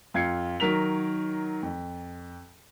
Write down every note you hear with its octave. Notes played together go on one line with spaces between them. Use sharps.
F2 F4 G#6 C7 C#7
D#3 F#3 A#4 B6 F7
F2